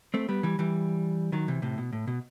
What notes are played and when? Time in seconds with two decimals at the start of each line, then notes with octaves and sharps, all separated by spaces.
0.14 A3 C4
0.29 G3 B3
0.43 E3 G3
0.59 E3 G3
1.32 D#3 F#3
1.48 C3 E3
1.62 A2 C3
1.78 B2
1.93 A2
2.07 B2